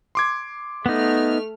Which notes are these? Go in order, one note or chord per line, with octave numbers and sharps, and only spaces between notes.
C6 D6 G#6
A3 B3 D#4 F6